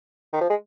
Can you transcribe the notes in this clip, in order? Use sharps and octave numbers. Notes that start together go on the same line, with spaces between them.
D#3
F3
G#3